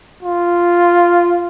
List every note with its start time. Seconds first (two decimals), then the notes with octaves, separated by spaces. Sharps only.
0.23 F4